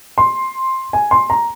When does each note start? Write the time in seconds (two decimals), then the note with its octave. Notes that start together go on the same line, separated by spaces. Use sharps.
0.18 C6
0.93 G#5
1.11 C6
1.30 A#5